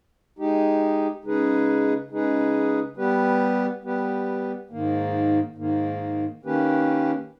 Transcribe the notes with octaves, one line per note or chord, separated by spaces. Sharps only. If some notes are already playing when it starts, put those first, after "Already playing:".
G#3 D#4 G4
C#3 G#3 D#4 G#4 B4
C#3 G#3 D#4 G#4 B4
G3 B3 G4 B4
G3 B3 G4 B4
G#2 D#3 A#3
G#2 D#3 A#3
D#3 A#3 C#4 G4 B4